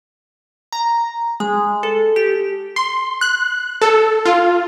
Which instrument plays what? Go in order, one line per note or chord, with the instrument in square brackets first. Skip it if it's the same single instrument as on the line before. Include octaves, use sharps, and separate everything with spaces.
[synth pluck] A#5
G#3
A4
G4
[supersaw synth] C6
F#6
A4
F4